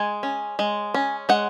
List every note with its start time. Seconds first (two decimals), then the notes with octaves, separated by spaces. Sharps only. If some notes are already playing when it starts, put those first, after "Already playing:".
Already playing: G#3 G#5
0.23 C#4
0.59 G#3
0.94 C#4
1.29 G#3 F#5